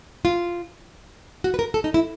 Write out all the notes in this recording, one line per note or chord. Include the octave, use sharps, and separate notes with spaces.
F4
F#4
B4
A#4
A4
D#4
E4